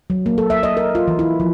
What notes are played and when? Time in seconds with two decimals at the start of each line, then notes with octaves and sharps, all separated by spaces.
0.10 F#3
0.26 A#3
0.38 A4
0.50 E5
0.63 D#5
0.77 A#4
0.95 F4
1.08 E3
1.19 E4
1.40 F3